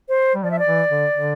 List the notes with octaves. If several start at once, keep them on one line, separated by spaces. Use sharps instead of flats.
C5
G3
F3 D5
E5
D5
E3
D3
D3